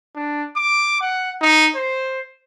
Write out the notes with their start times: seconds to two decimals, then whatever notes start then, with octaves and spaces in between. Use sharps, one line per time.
0.16 D4
0.56 D6
1.01 F#5
1.42 D#4
1.75 C5